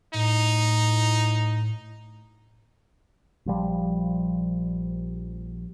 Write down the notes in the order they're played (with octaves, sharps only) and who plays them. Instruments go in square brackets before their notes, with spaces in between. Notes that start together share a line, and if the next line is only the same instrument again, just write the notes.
[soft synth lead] A2 [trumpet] D#4
[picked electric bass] A#1 F3 G3